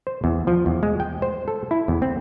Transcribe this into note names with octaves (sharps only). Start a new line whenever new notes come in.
C5
E2
F3
E2
G#3
G5
C5
A4
E4
E2
C4